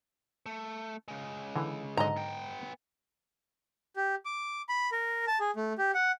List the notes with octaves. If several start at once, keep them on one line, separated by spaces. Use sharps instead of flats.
A3
C#3 G#3
D3 E3
G#2 D3 F#3 D#5 A#5
B3 G5
G4
D6
B5
A#4
A5
G#4
A3
G4
F#5